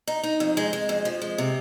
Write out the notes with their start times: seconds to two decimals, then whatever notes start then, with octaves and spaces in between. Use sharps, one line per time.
0.07 D#4
0.23 D#4
0.40 F2
0.57 G#3
0.73 G#3
0.89 F2
1.05 F3
1.22 G#3
1.38 C3